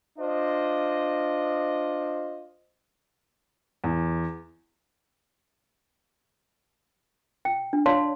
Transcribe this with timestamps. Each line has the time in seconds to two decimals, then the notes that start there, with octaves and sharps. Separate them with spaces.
0.19 D4 F4 C5 D#5
3.84 E2
7.45 G5
7.73 D4
7.86 C#5 D5 F5 A5 C6